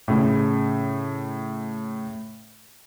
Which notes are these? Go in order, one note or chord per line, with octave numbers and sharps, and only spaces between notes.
A2 C#3